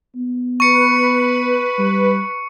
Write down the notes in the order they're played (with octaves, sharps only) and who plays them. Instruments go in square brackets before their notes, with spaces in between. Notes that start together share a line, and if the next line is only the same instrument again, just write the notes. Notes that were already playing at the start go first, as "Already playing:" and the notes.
[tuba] B3
[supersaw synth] B4 [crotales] C#6 C#7
[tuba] G3